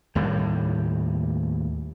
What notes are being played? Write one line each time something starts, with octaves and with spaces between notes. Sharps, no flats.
D#2 A2 G3